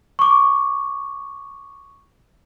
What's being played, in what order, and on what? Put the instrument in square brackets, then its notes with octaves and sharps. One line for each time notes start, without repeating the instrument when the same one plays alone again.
[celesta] C#6 D6